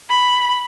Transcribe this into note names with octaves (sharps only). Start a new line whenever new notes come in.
B5